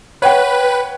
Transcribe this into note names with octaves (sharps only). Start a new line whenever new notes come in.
B4 C#5 F#5 G5